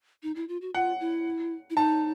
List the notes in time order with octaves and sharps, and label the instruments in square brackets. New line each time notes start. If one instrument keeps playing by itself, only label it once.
[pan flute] D#4
E4
F4
F#4
[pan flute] F4 [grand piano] F#5
[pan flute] E4
E4
[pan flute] D#4 [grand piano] A5